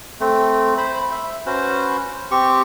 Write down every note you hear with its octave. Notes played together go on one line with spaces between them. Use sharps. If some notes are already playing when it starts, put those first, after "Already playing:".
A3 C4
C5 B5
E5
C#4 F#4 B4 C5
C4 G4 C#6